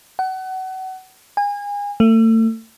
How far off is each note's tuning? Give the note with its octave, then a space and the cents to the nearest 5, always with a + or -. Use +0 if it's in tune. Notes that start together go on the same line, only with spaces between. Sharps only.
F#5 +30
G#5 -30
A3 +35